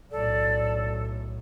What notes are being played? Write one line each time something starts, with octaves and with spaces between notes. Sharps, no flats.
B1 A2 A4 D5